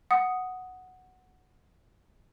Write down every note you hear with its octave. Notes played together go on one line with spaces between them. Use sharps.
F#5 D#6